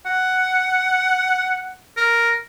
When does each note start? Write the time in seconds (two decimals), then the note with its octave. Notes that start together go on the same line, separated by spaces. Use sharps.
0.06 F#5
1.97 A#4